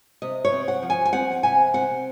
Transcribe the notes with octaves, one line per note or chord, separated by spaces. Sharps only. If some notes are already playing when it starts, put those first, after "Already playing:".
C3 D#5
C#5
C4
F#5
F3
G#5
G#5
C4 F#5
C3 G#5
C4 F#5